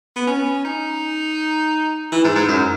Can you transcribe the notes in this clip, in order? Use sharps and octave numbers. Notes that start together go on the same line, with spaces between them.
B3
C#4
D#4
E3
G#2
G#2
F#2